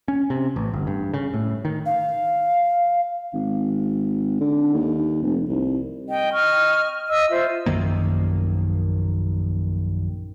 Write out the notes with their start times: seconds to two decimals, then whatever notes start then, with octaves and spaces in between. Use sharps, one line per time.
0.08 C#4
0.30 C3
0.56 A1
0.73 G1
0.87 G2
1.13 C#3
1.34 A2
1.65 D#3
1.86 F5
3.34 G#1
4.41 D3
4.74 D#2
5.22 F1
5.48 C2
6.08 D#5 G5
6.32 D#5 C#6 F6
7.08 D#5 E6
7.30 F4 C5 E5
7.66 A#1 F#2 D#3 A#3